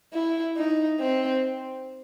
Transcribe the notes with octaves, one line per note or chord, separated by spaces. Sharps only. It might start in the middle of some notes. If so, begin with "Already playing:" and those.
E4
D#4
C4